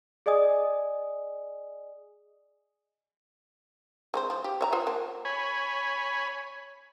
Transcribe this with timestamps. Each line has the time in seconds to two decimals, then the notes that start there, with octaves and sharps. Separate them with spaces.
0.26 G#4 D5 D#5 G#5 D#6
4.14 G#3 C4 C5
4.30 F3
4.44 G4
4.61 C#5 E5 A#5
4.73 F4 C5 F#5
4.87 A#3 A5
5.25 C#5 G#5 B5